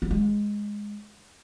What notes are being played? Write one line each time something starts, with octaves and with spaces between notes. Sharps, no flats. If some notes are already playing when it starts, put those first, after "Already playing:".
B3
G#3